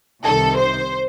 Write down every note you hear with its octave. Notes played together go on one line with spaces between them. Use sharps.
C2 C3 D#3 A4
C5